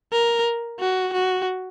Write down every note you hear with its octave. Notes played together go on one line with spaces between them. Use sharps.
A#4
F#4
F#4